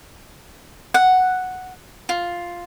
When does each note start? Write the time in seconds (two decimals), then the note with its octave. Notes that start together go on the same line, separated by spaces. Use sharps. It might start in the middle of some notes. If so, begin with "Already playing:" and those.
0.94 F#5
2.09 F4